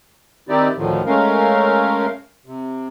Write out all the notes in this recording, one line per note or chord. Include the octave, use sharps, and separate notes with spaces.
D#3 C4 D#4 E4 G4 D5
D2 A2 D3 D#3 F3
G#3 A3 C#4 A#4 F5
C3